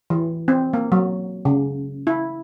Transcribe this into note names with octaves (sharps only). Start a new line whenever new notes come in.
E3
C4
A#3
F#3
C#3
E4